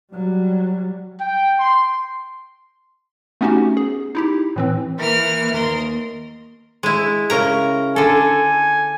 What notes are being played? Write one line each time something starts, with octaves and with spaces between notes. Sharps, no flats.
F#3 G3
G5
C6
A3 B3 C#4 D#4 F#4 G4
G#4
D#4 E4 G4
A2 E3 C4
E3 A#3 A#4 F6
D#2 A#4 C6
G#3 E4
C#3 A#4 A#5
D3 A4 G#5